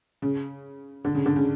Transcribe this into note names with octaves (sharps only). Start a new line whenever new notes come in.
C#3
D3
C#3
D3
C#3